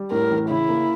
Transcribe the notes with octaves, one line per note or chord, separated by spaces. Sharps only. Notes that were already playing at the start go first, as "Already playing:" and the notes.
Already playing: G3
A2 A#4
A1
C#3 E4
A#3